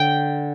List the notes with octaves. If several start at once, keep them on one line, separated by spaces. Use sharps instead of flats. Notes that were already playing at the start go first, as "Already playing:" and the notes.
Already playing: D3 G5